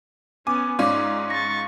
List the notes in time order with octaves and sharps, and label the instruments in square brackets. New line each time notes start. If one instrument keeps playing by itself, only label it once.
[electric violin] B3 C#4 [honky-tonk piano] G#5 [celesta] D6
[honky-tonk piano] G#2 C#4 F4 [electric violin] D#4 [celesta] D5 D6
[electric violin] C#6 A6 [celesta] A#6